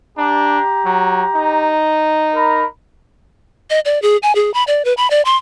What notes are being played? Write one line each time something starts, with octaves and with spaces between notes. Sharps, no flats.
D4 G4 A#5
F#3
D#4
A#4 B5
D#5
D5
G#4
G#5
G#4
B5
D5
B4
B5
D5
C6